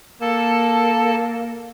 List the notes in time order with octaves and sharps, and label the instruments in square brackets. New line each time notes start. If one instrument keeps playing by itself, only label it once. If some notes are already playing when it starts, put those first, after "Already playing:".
[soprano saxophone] A#3 [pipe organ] A4 A5